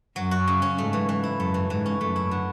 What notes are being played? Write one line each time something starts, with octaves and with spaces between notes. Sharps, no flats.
F#2 F#3
F#4
C#3
C#4
G#2 A3
E3
E3
E4
F#2 A3
E3
G#2 E3
C#4
F#2 A3
E4
D3